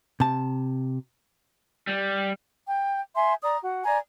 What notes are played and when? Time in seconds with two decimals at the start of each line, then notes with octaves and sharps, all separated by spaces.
0.20 C3 A5
1.87 G3
2.66 G5
3.15 E5 G#5 C6
3.42 D5 A#5 D#6
3.62 F#4
3.84 D5 G#5 A#5